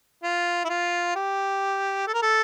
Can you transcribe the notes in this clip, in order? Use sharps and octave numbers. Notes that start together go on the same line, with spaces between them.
F4
E4
F4
G4
A4
A#4
A4